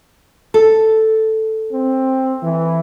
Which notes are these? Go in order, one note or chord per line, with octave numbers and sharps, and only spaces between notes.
A4
C4
E3